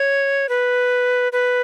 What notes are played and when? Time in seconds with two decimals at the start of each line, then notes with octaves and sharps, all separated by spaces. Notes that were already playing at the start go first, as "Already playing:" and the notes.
Already playing: C#5
0.49 B4
1.32 B4